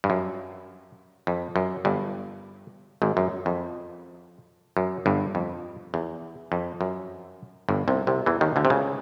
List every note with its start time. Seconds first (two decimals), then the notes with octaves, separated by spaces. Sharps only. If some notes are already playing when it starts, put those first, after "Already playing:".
0.04 G2
0.10 F#2
1.27 F2
1.56 F#2
1.85 G1 G2
3.02 G#1 G#2
3.17 F#2
3.46 F2
4.77 F#2
5.06 G1 G2
5.35 F2
5.94 E2
6.52 F2
6.81 F#2
7.69 G1 G2
7.88 C2 C3
8.07 C2 C3
8.26 E2 E3
8.41 D#2 D#3
8.56 D2 D3
8.65 C3
8.70 C#2 C#3